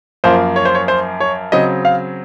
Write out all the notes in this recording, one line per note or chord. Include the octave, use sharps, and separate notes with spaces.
F#2 F3 A#3 C5
C#5
C5
C#5
C5
C#5
C#3 F#3 C4 D#5
F5